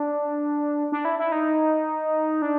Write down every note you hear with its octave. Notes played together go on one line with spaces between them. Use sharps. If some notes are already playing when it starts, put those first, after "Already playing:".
Already playing: D4
D4
E4
E4
D#4
D4